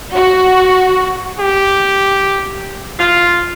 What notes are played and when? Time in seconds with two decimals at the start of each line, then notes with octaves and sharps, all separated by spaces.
0.14 F#4
1.39 G4
2.99 F4